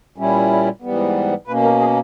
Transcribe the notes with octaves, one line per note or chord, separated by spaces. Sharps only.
A#2 G3 C#4 E4
G#2 E3 G3 B3
B2 A#3 C#4 B4
A#4
G#4